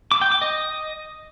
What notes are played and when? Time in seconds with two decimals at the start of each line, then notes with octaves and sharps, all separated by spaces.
0.11 D6
0.22 G5
0.32 D6
0.42 D#5